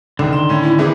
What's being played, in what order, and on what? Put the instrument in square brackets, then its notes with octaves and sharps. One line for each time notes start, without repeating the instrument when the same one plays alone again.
[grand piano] F#1 C#2 [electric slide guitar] D3 D#3
[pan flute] C6 [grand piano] E7
[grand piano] A2 C#4
[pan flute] E4
[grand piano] C3 E3 A#3 [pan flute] G#4